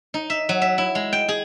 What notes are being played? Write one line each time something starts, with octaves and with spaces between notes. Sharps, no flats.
D#4
E5
F#3
E5
E4
G#3
G5
G#4